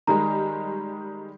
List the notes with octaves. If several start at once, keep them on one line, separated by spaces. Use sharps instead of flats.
D#3 G3 G#3 A#5